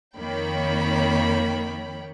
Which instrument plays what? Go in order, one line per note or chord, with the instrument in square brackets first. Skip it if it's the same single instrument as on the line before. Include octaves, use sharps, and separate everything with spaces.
[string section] F2 D#3 A#3 C#5 G5 B5